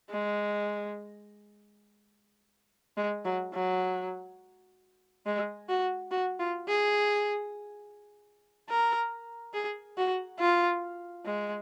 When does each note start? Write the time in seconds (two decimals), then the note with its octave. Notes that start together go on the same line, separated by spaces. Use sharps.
0.10 G#3
2.97 G#3
3.25 F#3
3.54 F#3
5.26 G#3
5.69 F#4
6.11 F#4
6.39 F4
6.68 G#4
8.69 A#4
9.54 G#4
9.98 F#4
10.40 F4
11.25 G#3